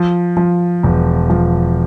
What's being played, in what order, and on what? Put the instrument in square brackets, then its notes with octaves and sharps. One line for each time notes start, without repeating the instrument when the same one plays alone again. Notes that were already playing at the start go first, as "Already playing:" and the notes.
Already playing: [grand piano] F3
F3
E1
F3